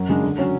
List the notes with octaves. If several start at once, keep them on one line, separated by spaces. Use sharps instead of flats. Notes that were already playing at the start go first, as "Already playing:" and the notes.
Already playing: F#2
C#3 G#3 D4
D3
F#3 C#4